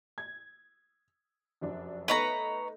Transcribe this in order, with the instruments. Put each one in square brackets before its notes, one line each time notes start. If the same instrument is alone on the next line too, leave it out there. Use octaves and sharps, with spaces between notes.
[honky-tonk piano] G#6
F1 F#2 D4
[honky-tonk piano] A3 B3 D#4 [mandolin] B4 C#5 A#5